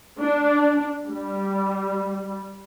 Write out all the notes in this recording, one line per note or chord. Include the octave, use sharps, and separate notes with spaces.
D4
G3